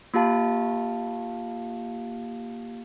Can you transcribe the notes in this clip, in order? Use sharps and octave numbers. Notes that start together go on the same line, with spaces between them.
A#3 F4 G4 F5 A5